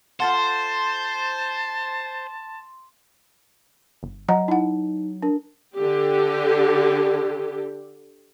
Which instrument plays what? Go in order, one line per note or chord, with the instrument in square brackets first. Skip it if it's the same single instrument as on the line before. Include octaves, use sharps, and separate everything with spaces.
[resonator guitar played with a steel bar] F4 A4 F#5 [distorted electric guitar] C5 [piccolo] A5 [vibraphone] C6
[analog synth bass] G1
[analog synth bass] F#3 [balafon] D#5 F#5 A#5
[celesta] D#4 [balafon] E4 F#5
[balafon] D4 [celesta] A#4
[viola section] D3 G4